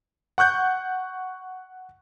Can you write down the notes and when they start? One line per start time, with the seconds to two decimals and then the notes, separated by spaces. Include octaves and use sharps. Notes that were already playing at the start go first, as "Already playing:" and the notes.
0.38 F#5 C#6 F#6 G6